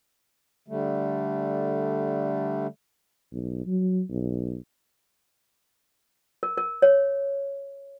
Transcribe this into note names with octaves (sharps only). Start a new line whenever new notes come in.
D3 G3 A3
B1
F#3
B1
A#4
A#4
C#5